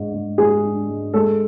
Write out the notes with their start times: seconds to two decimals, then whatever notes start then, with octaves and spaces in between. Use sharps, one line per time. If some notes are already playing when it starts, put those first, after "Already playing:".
Already playing: G#2 D4
0.13 G#2
0.38 G#3 G#4
0.64 D4
0.89 G#2
1.13 G#3 A4